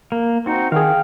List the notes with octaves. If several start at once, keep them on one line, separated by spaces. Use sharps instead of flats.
A#3
C4 D#4 F#4
D#3 G#4 F5 G5